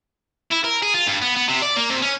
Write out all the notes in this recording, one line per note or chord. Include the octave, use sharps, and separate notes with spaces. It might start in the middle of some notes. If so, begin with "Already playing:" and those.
E4
A#4
G#4
F4
G2
B3
B3
C3
D5
A#3
C3
C#4